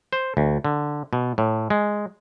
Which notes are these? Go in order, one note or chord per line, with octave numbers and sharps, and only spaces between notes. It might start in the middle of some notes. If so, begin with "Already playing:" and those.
C5
D2
D3
B2
A2
G#3